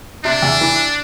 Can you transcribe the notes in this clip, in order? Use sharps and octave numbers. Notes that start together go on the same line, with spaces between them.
C3 D4
E2
E3